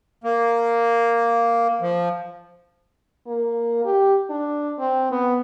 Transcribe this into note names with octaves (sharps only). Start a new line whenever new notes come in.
A#3
F3
A#3
G4
D4
C4
B3